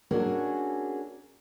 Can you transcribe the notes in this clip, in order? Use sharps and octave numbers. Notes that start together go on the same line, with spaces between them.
A#3 C#4 D4 F#4 G#4 A4